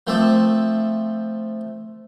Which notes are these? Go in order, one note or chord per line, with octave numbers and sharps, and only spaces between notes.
F3 A3 C4 A4 E5 D6